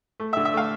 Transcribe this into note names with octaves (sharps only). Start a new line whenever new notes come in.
A3
E5
D3
E5
A3 F5